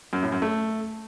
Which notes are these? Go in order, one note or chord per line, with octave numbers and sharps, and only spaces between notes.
F#2
A2
F#2
A3